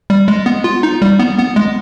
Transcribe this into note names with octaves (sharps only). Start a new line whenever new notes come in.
G3
G#3
B3
F4
D#4
G3
B3
B3
G#3